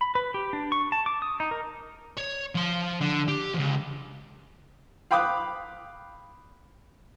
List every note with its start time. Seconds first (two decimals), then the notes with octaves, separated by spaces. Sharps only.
0.01 B5
0.15 B4
0.34 G4
0.53 D4
0.72 C#6
0.92 A5
1.06 D6
1.22 D#6
1.40 D#4
1.51 A#4
2.18 C#5
2.55 F3 C6
3.01 D3
3.28 G4
3.54 C#2 F3
5.11 F5 G5 B5 D6 D#6 F#6